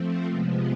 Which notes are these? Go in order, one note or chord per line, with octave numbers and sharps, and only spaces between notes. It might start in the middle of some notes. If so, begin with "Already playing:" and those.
Already playing: F3 A3 C4
C3 F3 G#3 B3